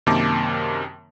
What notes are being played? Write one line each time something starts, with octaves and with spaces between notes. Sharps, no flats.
F#2 C3 D#3 A#3 A5 D6